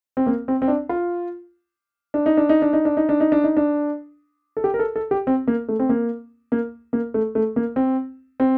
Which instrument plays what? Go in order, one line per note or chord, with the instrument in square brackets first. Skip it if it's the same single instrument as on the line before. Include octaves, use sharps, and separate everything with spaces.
[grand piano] C4
A#3
C4
C4
D4
F4
D4
D#4
D4
D#4
D4
D#4
D4
D#4
D4
D#4
D4
D#4
D4
A4
G4
A#4
A4
A4
G4
C4
A#3
A3
C4
A#3
A#3
A#3
A3
A3
A#3
C4
C4